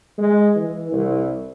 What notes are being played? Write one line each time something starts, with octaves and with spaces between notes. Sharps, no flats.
G#3
E3
C2